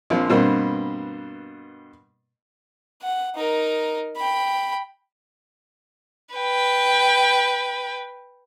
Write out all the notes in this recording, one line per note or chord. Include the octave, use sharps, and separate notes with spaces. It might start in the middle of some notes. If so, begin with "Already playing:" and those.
A#1 F3 C4
G2 B2 A#3 C4
F#5
D#4 A#4
G5 B5
B4 G5